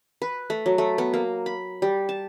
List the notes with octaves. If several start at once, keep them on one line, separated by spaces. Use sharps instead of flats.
B4
A3
F#3
A3
B3
A#3
B5
G3
A5